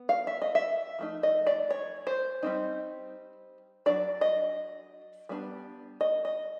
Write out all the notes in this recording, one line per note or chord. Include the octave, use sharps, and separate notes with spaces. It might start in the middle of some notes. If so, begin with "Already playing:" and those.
Already playing: B3
F5
E5
D#5
E5
F3 A3 D#4
D#5
D5
C#5
C5
G3 C4 D#4
F#3 A3 D4 D5
D#5
G3 B3 D4
D#5
D#5